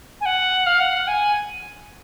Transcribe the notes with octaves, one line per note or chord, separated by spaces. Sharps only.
G#5
F#5
F5
F#5
G#5